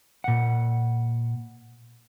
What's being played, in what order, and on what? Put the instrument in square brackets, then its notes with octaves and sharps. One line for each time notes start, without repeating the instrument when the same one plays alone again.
[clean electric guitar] A#2 F#5